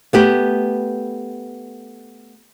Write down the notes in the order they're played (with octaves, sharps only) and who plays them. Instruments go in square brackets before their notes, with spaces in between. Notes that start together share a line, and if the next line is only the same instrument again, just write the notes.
[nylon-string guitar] A3 B3 G4